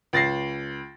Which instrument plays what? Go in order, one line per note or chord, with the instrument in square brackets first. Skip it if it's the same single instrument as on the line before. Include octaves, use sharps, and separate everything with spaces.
[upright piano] C#2 A6 A#6 C7